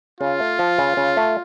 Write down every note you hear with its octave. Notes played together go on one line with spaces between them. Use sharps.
C#3 F4
A3
F3
C#3
C#3
A3